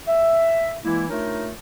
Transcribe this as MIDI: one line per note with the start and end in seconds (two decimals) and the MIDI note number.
0.08 0.73 76
0.84 1.08 52
0.84 1.08 56
0.84 1.08 58
0.84 1.08 64
1.08 1.50 57
1.08 1.50 62
1.08 1.50 63
1.08 1.50 65
1.08 1.50 70
1.08 1.50 73